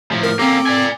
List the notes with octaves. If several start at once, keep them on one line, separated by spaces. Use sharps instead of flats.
A2 F3
A#4
A#3 C4 C#4 A4 D6
D5 G#5